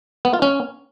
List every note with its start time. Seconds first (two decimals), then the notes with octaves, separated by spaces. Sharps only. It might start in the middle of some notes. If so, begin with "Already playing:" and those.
0.25 B3
0.33 F4
0.42 C#4